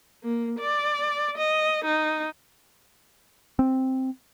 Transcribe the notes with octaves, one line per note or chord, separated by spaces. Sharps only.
A#3
D5
D#5
D#4
C4